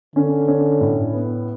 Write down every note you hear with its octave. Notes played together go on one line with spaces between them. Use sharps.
D3 C#4
C#4
A2
B3